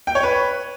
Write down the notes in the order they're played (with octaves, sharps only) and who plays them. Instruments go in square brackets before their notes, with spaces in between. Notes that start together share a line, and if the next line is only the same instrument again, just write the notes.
[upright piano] G5
C#5
B4